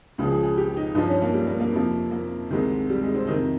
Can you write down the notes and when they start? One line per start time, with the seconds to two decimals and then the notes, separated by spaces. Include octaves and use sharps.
0.18 C#2 C#3 F3
0.31 G#4
0.43 G#4
0.57 G4
0.77 D#4
0.95 G2 F3 D#4
1.08 C#4
1.22 A#3
1.34 G3
1.47 A#3
1.60 A#3
1.72 F2 C3 F3
2.11 A#3
2.50 C2 C3 D#3 G#3
2.90 G3
3.02 G#3
3.15 C4
3.27 F2 C3 D#3 D#4